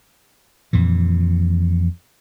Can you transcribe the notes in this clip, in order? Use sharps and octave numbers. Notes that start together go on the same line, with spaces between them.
F2 A#2 E3